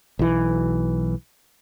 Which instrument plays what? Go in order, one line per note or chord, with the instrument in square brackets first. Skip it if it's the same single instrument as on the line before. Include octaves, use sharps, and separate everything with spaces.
[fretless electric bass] B1 E3